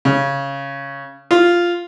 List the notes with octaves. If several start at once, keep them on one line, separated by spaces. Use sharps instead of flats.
C#3
F4